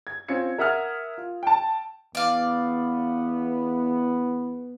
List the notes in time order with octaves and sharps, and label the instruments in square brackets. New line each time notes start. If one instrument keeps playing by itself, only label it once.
[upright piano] G#6
C4 C#4 F4 G#6 C#7
A#4 E5 F#5 D#6 F6 G#6
F4
G5 A5
[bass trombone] E2 [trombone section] B3 [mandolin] D5 F5